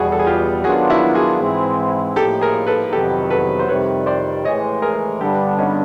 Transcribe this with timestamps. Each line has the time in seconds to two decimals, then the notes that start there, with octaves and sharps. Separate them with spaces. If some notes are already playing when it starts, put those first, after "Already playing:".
Already playing: E2 B2 G3 B3 F#4 G#4
0.12 A4
0.19 G#4
0.27 F4 G4
0.64 D#3 F#3 B3 D4 F4 F#4 G#4
0.90 E4 F#4
1.15 F#4 G#4
1.40 G#2 E3 G#3 C4 E4
2.16 A2 F3 A#3 D#4 G4 A4
2.41 G#4 A#4
2.67 A4 B4
2.92 F2 C3 D#3 F#3 B3 G4 A4
3.30 A4 B4
3.59 C5
3.68 F2 C3 D#3 G3 B4 C#5
4.06 C5 D5
4.45 A2 E3 G#3 C#5 D#5
4.82 G#4 A#4
5.21 G2 D3 G3 B3 D4 G4 A4
5.58 C#4 D#4